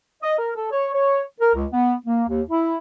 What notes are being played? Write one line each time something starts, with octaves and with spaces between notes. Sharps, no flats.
D#5
A#4
A4
C#5
C#5
A#4
C#2
B3
A#3
D#2
E4